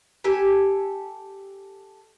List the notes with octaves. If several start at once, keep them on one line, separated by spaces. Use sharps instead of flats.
G4 A4 G#5